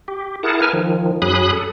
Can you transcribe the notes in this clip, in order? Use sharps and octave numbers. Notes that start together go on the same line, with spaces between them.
G4
E4 G#4 A#4 F#5 A5
A#4 B4 G#5 F6
D#3 F3
F#2 F#3 G#4 B5 D#6 F#6
A4